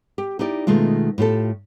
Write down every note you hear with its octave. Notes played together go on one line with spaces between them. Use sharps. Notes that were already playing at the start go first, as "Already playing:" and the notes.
G4
D#4 E4 G4 D5
B2 D#3 G#3 A3 F4
A2 F4 G4 A4